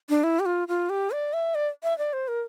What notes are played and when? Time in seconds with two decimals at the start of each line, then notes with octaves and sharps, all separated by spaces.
0.09 D4
0.23 E4
0.39 G4
0.45 F4
0.68 F4
0.89 G4
1.11 D5
1.33 E5
1.55 D5
1.83 E5
1.98 D5
2.13 C5
2.28 A#4